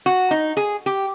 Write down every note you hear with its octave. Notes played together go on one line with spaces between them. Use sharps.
F#4
D#4
G#4
G4